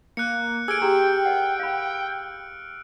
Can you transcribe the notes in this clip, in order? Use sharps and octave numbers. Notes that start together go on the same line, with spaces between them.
A#3 F#6 C#7
G#4 A4 G#5 E6 F6 D7
G4 G#4 G5 A#5
A#4 D#5 F#5
F5 B5